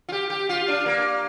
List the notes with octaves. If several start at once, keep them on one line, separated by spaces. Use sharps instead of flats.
F4
G4
G4
F4
D4
A#3